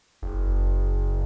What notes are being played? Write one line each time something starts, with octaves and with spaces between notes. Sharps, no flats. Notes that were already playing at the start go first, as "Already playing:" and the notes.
F#1